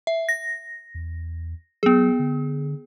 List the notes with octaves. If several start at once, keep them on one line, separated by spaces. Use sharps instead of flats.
E5
A#6
E2
F#3 B3 G#4
D3